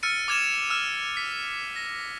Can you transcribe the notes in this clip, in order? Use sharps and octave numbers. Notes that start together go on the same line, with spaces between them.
E6 F6 A6 C#7 D#7
D6 F6 G#6 D#7 E7
E6 F6 E7
B6
A#6